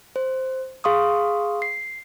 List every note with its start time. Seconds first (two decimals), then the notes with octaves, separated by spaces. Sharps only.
0.16 C5
0.84 G#4 F5 C6 C#6 D#6
1.62 C7